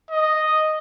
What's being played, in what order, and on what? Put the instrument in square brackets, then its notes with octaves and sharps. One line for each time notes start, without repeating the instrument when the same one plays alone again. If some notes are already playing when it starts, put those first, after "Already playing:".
[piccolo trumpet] D#5